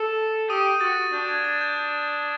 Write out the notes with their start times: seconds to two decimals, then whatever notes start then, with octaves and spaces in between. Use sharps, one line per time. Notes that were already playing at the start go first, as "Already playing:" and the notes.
Already playing: A4
0.50 G4 D#6 D#7
0.81 F#4 A6
1.13 D4 G6
1.28 G#6
1.44 A6
1.61 G6